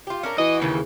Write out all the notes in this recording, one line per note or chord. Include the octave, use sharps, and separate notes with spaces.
F4 G4
C#4 D4 A#4
E3 F#4 D#5
D#2 C#3